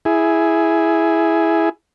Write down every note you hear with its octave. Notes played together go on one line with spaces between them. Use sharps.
E4 G#4